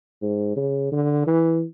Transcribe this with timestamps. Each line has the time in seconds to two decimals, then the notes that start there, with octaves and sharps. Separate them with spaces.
0.22 G#2
0.56 C#3
0.92 D3
1.27 E3